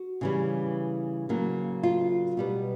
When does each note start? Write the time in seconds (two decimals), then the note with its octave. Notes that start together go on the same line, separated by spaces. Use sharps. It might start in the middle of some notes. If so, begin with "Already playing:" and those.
Already playing: F#4
0.21 C#3 E3 G3
1.29 C#3 F#3 A#3
1.83 F4
2.37 B2 G3 B3